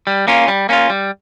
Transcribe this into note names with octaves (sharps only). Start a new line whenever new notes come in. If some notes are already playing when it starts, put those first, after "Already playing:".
G3
A#3 C#4 F4
G3
A#3 C#4 F4
G3